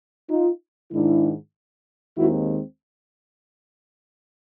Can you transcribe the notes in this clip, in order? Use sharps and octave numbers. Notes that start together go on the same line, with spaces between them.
D#4 F4
G#2 D#3 G#3 D4 E4
D#2 D#3 G#3 C4 E4 F#4